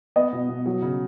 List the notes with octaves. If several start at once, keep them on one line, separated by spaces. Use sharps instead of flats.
B3 D#5
B2
B2
F#3
C#3